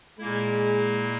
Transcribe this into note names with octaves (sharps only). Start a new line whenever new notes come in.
A#2 G#3 A#3 E4